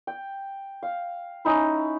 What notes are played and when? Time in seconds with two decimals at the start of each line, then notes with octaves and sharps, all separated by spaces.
0.07 G5
0.83 F5
1.45 C#4 D#4 E4